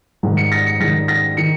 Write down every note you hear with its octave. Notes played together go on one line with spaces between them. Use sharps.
G#2 D#3
C#7
A#6
C#7
G#2 D#3 A#6
A#6
D#3 C#7